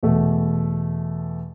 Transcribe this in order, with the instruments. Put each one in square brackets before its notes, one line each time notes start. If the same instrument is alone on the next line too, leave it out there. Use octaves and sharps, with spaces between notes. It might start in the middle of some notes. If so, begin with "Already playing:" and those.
[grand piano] E2 B2 A3